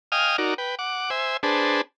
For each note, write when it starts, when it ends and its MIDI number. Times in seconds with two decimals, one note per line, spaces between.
0.12 0.37 75
0.12 0.37 77
0.12 0.37 79
0.12 0.37 80
0.12 0.37 87
0.12 0.37 89
0.38 0.54 63
0.38 0.54 66
0.38 0.54 70
0.38 0.54 74
0.58 0.75 71
0.58 0.75 79
0.79 1.10 78
0.79 1.10 86
1.10 1.37 72
1.10 1.37 76
1.10 1.37 80
1.43 1.81 62
1.43 1.81 68
1.43 1.81 71
1.43 1.81 72
1.43 1.81 81